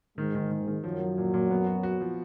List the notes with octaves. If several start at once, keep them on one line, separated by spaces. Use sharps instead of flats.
G#2 D#3 G#3
D#3
D#3
D#3
F#2 F3 F#3
F3
A#2
A#2
B3
F#4
F#4
F3